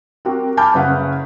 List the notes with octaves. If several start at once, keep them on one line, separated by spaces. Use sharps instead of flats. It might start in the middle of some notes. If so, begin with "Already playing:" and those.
C4 F#4 G4 A#4
G#5 A5 B5 D6 F6 G6
F#1 C#3 B4 F#5